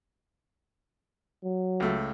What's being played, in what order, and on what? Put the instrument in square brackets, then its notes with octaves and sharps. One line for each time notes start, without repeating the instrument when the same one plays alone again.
[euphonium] F#3
[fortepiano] C#2 A3